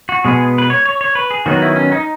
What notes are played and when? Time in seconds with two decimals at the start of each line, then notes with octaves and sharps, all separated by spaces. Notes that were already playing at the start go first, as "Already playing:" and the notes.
0.09 F#4
0.24 B2 G#3 B3 G#4
0.58 B4
0.70 C#5
0.85 C#5
1.01 C#5
1.15 B4
1.31 G#4
1.46 D#3 F#3 B3 D#4 F#4
1.62 E4
1.76 C#4
1.92 D#4